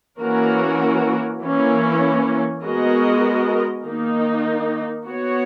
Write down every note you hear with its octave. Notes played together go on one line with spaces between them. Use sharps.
E3 A#3 C#4 F#4 A#4
E3 A#3 C#4
G#3 B3 F#4 A#4 D#5
D#3 A#3 D#4
B3 F#4 C#5